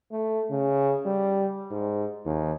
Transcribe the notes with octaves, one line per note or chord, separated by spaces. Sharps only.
A3
C#3
G3
G#2
D#2